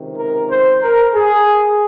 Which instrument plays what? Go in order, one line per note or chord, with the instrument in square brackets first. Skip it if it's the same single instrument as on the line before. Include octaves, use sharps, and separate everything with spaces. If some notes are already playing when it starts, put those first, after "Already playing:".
Already playing: [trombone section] C#2 C3 D#3
A#4
C5
A#4
G#4